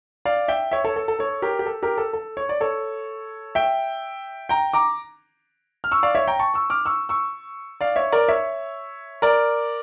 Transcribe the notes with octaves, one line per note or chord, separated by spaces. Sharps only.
D5 F5
E5 G5
C#5 E5
A4 C#5
A4
A4
A4 C#5
G4 A#4
G4
A4
G4 A#4
A4
A4
C#5
D5
A4 C#5
E5 G5
G5 A#5
A#5 D6
F6
C#6 E6
D5 F5
C#5 E5
G5 A#5
A5 C#6
C#6 E6
D6 F6
C#6 E6
C#6 E6
D5 F5
C#5 E5
A#4 D5
C#5 E5
A#4 D5